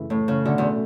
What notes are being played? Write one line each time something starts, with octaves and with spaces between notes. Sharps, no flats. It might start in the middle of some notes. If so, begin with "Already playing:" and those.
Already playing: F#2 C#3 E3 A3 E4
A2
C#3
B2 D3 A3 C#4
E2